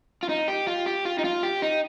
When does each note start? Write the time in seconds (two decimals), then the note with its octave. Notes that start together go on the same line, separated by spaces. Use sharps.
0.23 F4
0.29 D#4
0.48 G4
0.67 F4
0.86 G4
1.05 F4
1.19 D#4
1.24 F4
1.43 G4
1.62 D#4